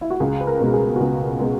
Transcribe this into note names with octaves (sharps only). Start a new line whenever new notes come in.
E4
F#4
C#2 G#4
B4
A#4
B2 G#3
G#4
F#4
C#2 G#4
B2 G#3